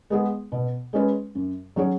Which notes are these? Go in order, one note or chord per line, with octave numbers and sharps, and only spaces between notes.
G#3 B3 G#4
B2
G#3 C#4 B4
F#2
F#3 C#4 G#4 C#5